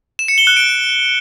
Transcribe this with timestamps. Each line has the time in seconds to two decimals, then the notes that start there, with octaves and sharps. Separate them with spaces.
0.19 E7
0.28 C#7
0.38 G7
0.47 F#6
0.56 D7